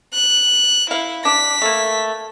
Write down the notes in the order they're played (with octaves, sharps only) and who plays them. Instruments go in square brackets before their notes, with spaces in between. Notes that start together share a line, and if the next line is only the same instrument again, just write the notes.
[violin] F#6
[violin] E4 [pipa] F5
[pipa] D4 [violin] B6
[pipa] A3 A#3